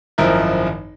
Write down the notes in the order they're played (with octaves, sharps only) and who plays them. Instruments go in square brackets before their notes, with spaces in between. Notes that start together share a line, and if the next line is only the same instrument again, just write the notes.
[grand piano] G#1 F#2 F3 D#4 E4 A#4